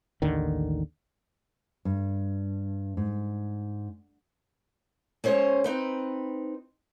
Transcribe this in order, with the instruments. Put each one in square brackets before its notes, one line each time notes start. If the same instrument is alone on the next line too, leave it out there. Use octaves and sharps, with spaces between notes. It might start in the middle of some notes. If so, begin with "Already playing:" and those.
[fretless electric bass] A1 D#2 D3 D#3
[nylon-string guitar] G2
G#2
[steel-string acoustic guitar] G#3 C#4 C5 C#5
C4 D#4 B4